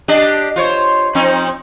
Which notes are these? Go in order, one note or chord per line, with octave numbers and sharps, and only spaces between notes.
D4 G4 D#5
F4 C5 C#5
F3 C4 D#4